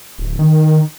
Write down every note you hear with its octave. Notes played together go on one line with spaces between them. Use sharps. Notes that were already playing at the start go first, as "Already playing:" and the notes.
D1
D#3